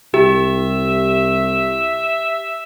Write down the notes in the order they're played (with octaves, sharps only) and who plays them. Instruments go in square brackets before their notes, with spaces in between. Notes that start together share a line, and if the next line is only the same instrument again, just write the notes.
[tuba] C2 [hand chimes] G4 [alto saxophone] E5